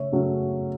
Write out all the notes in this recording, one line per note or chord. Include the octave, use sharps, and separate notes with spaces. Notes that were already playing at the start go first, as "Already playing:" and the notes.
Already playing: C#3 A3 C#5 E5
C#3 F#3 A3 C#4